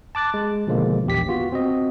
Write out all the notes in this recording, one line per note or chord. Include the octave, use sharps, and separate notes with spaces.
A5 D6 F#6 A6
G#3
B2 D3 D#3 F3 G#3 A#3
A#1 E2 G4 B6
B3 F4 F#4
C4 F#4 D#5